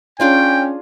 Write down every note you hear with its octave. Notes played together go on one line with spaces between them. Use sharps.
C#4 D4 F4 G#4 G5